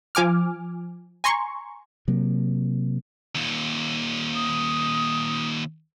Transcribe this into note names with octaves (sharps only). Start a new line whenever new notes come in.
F3 G#5 D6 F6
G#5 A#5 C6 C#6
C3 F#3 A#3
D#2 A#2
D#6